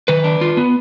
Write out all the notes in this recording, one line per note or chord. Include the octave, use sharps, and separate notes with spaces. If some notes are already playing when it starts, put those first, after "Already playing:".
D#3 B4
D4
F4
B3